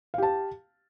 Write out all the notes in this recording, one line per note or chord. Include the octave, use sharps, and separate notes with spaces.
G4 F5 A5